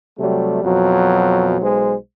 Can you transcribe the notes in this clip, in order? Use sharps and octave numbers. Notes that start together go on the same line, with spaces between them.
C3 F#3 G3 A3
F2 B2 F#3
B1 G#3 C5